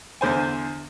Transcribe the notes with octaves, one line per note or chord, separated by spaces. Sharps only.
E2 D3 C5 G#5